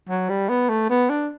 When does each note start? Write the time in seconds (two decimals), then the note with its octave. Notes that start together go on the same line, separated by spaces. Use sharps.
0.09 F#3
0.29 G3
0.49 B3
0.69 A3
0.90 B3
1.09 D4